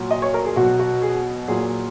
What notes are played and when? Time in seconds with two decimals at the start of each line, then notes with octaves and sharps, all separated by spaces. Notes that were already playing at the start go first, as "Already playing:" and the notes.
Already playing: A#2 F#3
0.11 D#5
0.22 C#5
0.34 A#4
0.45 G#4
0.56 B2 F#3 F#4
0.79 F#4
1.02 G#4
1.48 A#2 F#3 G#4